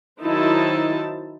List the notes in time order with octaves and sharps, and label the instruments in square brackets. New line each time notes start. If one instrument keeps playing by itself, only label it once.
[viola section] D#3 F#3 D#4 E4 C5 A5